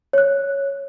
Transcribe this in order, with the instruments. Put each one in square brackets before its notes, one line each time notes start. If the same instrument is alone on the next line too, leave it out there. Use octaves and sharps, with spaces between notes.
[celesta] C#5 F#6